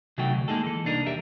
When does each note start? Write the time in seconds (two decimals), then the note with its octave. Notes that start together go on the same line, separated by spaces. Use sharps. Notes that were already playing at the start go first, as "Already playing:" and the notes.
0.18 C3 F#3 A3 D#4 F#4 G5
0.34 D2
0.48 G#3 A#3 B3 D#4 G#4 A4
0.64 E3 A4
0.85 C2 A#3 D4 D#4 A#4
1.06 E2 G4 A#4 E5